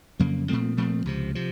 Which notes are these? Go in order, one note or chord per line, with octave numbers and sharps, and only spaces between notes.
F2 C#3 F#3 A#3
A#2 F3 A3 C4
A#2 F3 A3 C4
C#2 C3 F3
C3 F3